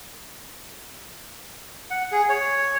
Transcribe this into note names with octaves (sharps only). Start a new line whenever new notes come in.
F#5
G#4
C#5